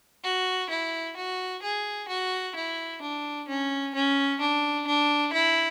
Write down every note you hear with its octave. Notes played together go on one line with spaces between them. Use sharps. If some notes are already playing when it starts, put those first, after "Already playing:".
F#4
E4
F#4
G#4
F#4
E4
D4
C#4
C#4
D4
D4
E4